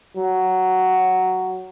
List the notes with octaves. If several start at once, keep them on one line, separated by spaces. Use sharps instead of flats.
F#3